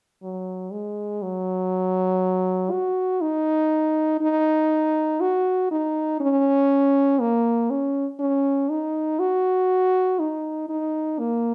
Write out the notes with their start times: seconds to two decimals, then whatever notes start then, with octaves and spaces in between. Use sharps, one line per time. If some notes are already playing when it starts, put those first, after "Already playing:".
0.23 F#3
0.72 G#3
1.22 F#3
2.71 F#4
3.21 D#4
4.21 D#4
5.21 F#4
5.71 D#4
6.20 C#4
7.21 A#3
7.70 C#4
8.20 C#4
8.70 D#4
9.19 F#4
10.19 D#4
10.69 D#4
11.19 A#3